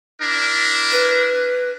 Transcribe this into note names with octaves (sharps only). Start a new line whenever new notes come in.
D4 E4 A#4
B4